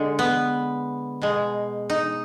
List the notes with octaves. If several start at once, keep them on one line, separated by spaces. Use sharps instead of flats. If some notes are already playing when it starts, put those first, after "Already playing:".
Already playing: D3 G#3
B3
B2 G#3
D#4